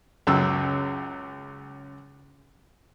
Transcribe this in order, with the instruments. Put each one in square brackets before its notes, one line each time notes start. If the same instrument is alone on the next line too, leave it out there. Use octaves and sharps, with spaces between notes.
[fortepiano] C#2 F#2 E6